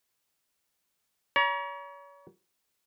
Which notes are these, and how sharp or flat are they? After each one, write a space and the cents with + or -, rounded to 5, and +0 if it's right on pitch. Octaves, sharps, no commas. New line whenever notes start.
C#5 +35 A#5 +40